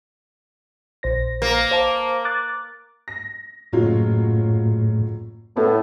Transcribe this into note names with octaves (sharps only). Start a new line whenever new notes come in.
A#1 C5 A#6
A#3
C5 F5 A5
D6 F#6 A6
A#6
F#1 A2 F#3 F4
A2 B3